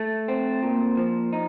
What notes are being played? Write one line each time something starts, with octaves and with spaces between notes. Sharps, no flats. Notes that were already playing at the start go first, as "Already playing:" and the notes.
Already playing: A3
C4
A#2
F3
D#4